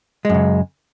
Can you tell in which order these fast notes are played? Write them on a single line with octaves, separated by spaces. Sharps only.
G#3 F#2 C#3